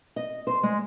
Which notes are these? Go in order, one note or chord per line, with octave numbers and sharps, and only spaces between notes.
D#5
C5
G#3